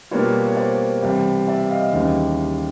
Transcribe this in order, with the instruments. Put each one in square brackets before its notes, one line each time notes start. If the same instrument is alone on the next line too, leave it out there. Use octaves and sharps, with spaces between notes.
[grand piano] B2 G3 A#3 D4 F4 B4 C#5
C#5
C5 D5
C2 C3 E3 G3
D5 E5
D#5 F5
D#2 C#3 E3 G3